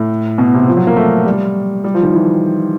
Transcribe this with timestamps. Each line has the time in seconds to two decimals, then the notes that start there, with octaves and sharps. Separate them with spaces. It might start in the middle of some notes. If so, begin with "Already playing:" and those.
Already playing: A2
0.38 B2
0.54 C3
0.68 F3
0.77 F#3
0.87 A#3
0.96 A3
1.26 G3
1.84 G3
1.94 F3
2.03 D#3
2.13 E3